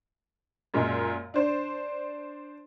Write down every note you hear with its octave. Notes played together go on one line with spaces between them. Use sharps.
F#2 A#2 G#3
D4 C5